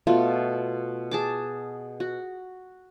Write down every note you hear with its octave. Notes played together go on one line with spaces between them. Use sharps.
B2 A3 F4
G#4 A5 D6
F#4